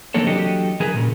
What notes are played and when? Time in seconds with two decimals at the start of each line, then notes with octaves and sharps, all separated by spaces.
0.14 E3 A#3 C4 D4 A4 C#5
0.27 E3 F#3 D4 G4 A4 D#5
0.80 E3 G#4 A#4 B4
0.94 A#2 C#3